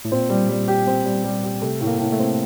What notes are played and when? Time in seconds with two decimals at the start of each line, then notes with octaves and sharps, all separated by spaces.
0.05 A2
0.12 A#2 C4
0.30 G3
0.49 G3
0.68 G4
0.87 C4
1.05 G3
1.24 G3
1.43 G4
1.62 C3 A3
1.81 A2
1.87 A#3
1.99 A2
2.12 A3
2.19 C4